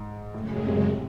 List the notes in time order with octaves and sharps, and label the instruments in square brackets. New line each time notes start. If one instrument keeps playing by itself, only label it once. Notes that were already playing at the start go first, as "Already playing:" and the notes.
Already playing: [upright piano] G#2
[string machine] F#2 C#3 G#3 [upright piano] A2
[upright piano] A2
C3